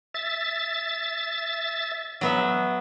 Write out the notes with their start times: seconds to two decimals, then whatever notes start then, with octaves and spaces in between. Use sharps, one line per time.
0.14 E5 A6
2.21 F#3 B3 E5